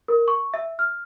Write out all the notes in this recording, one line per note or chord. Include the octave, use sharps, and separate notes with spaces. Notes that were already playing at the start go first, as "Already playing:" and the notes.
A#4
C#6
E5
F6